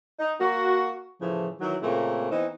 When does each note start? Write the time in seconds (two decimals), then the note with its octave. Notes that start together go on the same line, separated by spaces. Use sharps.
0.19 D#4
0.40 A#3 F#4
1.21 A2 C#3 E3 F3
1.60 D#3 E3 F#3
1.82 A#2 C#3 A3 A#3 C4
2.31 E3 B3 C4 D#4